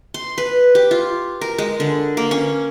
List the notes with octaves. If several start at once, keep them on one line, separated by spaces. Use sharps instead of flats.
C6
B4
G4
F4
A#4
G#3
D3
A#3
C#4